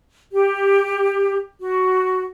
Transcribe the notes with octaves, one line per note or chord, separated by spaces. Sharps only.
G4
F#4